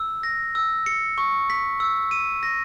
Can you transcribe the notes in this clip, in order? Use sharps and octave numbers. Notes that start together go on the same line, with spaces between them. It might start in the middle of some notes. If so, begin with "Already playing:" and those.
Already playing: E6
A#6
E6
C#7
C#6
B6
E6
D#7
A#6